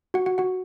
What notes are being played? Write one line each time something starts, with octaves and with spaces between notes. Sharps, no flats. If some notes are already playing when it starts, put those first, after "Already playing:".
F#4 F#5
F#4 F#5
F#4 F#5